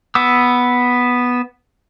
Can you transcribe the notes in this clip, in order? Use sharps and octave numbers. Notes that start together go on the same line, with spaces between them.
B3 E6